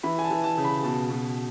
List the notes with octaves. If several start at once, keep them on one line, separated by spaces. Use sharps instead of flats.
E3 B5
G#5
A5
E3
A5
C#3
B5
B2 A5
B2